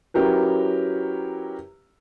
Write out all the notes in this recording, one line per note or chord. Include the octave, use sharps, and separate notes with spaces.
F#3 C#4 E4 G4 A#4 B4